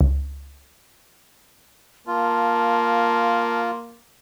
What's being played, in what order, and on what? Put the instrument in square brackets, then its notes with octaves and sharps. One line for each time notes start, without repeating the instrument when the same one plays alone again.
[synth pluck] C#2
[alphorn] A#3 [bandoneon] F4 [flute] A5